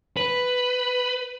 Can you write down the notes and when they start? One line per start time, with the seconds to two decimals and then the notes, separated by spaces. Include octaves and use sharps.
0.17 B4